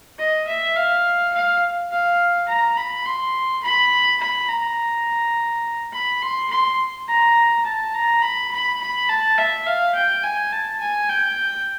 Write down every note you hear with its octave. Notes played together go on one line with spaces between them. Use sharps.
D#5
E5
F5
F5
F5
A#5
B5
C6
B5
B5
A#5
B5
C6
C6
A#5
A5
A#5
B5
B5
B5
A5
E5
F5
G5
G#5
A5
G#5
G5